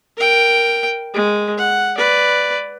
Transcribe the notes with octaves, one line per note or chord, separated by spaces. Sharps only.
A#4 G5
G#3
F#5
B4 D5